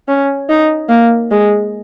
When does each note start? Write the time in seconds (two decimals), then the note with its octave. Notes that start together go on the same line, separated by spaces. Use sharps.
0.08 C#4
0.49 D#4
0.89 A#3
1.31 G#3